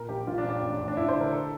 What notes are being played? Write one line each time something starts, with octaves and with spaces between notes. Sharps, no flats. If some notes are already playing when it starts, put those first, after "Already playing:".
Already playing: A#2 A#4
A#1 G4
A#1 F4
D4
A#1
D4
A1
A1
D4
A1 E4
C5
D3
A#4
A4